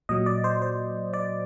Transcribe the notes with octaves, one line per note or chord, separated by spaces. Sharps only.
A#2 F#3 D#5
D5
C5
C5
D5